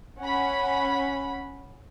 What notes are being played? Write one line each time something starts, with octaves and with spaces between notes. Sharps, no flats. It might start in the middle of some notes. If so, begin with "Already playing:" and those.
C#4 F#5 B5